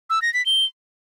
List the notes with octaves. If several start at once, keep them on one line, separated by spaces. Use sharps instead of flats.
E6
A#6
B6
G7